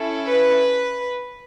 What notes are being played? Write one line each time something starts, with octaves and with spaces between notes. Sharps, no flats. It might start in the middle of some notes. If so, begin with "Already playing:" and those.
Already playing: C#4 E4 A4
B4